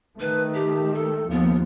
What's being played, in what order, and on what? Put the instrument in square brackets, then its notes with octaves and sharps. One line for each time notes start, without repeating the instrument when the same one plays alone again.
[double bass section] D#3 A3 [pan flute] B4
[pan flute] G4
A4
[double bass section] D#2 F3 [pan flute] B3